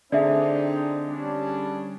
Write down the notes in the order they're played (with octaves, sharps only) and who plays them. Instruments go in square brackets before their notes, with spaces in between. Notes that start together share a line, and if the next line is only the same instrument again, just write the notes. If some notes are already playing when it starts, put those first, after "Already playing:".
[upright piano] D3 G#4 [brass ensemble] C4 D4 D#4 [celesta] D5 E5
[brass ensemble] G3 C#4 D4